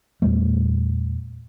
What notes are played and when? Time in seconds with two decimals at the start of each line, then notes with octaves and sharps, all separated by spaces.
0.22 E2 A#2 G3 A3